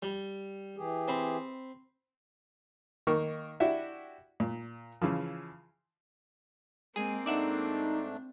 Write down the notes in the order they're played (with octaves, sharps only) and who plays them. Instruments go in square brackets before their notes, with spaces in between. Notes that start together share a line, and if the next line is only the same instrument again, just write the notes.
[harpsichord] G3
[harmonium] E3 G4 G#4
[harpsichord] C4 B5
[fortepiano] D#3 A#3 C#6
D4 E4 F#4 G4 E5
A#2
C#3 E3 F3
[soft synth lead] G#3 [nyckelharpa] A#3 C4 [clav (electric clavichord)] G#4 G#5
[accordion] G#2 A3 D4 [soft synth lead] D#4 [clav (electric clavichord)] D5 E5 F#5